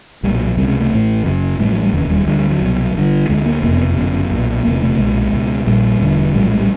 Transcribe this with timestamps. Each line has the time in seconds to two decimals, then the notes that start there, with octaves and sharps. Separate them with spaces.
0.23 B1 A#2 G3
0.34 F#3
0.46 F#3
0.57 C#2 C3 G3
0.68 G#3
0.80 A3
0.92 A1 A2
1.25 F#1 F#2 C#3
1.59 A1 A2 G3
1.71 F#3
1.82 G3
1.93 E1 D#2 C#3
2.10 G3
2.27 D2 D3 G3
2.39 G3
2.50 F#3
2.61 C2 B2
2.95 G1 G2 D3
3.29 D2 D3 G#3
3.46 A#3
3.63 F#1 F2 C3 A#3
3.74 B3
3.97 G1 F#2 C#3 B3
4.31 B1 A#2
4.65 E1 D2 C3 A#3
4.82 A3
4.99 B1 A#2 G#3
5.33 C#2 B2
5.67 A#1 A#2 G3
6.00 E1 D2 D3
6.35 A#1 A2 G3
6.43 F#3
6.51 G#3
6.60 G3